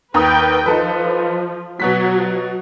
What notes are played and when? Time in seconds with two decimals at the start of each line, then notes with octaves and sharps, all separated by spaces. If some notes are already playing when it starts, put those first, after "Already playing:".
0.14 D#2 B4 G5 A#5 D#6
0.66 F3 D#4 A4 B4
1.80 B2 F#3 F#4 B6